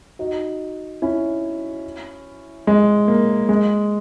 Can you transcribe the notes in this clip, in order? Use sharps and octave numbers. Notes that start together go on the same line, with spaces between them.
D#4 F#4
C#4 E4
G#3
A#3
G#3